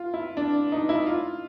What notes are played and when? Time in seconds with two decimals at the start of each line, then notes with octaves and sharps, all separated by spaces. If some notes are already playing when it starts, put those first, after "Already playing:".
Already playing: F4
0.14 E4
0.37 D4
0.72 D#4
0.89 E4
1.06 F4